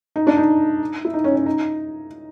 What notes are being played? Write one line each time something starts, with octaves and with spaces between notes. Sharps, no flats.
D#4
D4
D#4
E4
D#4
C#4
C#4
D#4